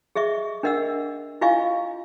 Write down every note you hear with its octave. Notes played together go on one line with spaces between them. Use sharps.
G#4 D#5 E5 C#6
D4 A#4 D#5 F#5 E6
E4 F4 D#5 F5 G#5 C#6